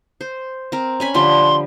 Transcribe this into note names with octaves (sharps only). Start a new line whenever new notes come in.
C5
C4 A#4
C#4 G#5 B5
D3 F3 G3 C6